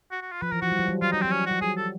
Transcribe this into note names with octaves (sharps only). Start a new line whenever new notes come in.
F#4
F#4
F4
F3 B4
E3 A#4
F3 F#4
G3
F#3
G3
F#3 F4
G3 D#4
C4
F#3
C#4
F#3 F#4
G3 G#4
A4